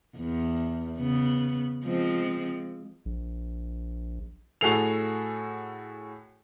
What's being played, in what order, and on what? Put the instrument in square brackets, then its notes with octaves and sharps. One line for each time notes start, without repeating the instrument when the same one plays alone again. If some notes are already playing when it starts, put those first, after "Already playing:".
[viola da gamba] E2
C#3 B3
F3 G#3 C4
[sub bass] A#1
[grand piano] A2 F#4 G#4 A4 C7 F7